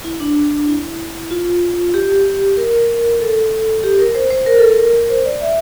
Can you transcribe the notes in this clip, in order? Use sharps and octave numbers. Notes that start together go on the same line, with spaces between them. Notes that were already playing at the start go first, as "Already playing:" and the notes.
E4
D4
E4
F4
G4
A#4
A4
G4
A#4
C5
C5
A#4
A4
A#4
C5
D5
E5